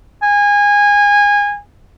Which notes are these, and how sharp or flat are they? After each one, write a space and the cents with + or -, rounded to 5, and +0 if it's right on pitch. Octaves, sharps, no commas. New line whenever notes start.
G#5 -25